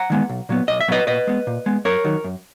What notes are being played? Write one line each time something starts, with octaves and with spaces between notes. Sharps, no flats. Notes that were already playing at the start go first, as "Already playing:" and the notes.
Already playing: F#5 A#5
D#3 G#3 B3
B1
A#2 F#3 B3
B1 D#5
E5
A#2 F#3 B3 B4 D#5
A#2 B4 D#5
G#3 B3
A#2
G#3 B3
F#2 A#4 C#5
D#3 F#3
F#2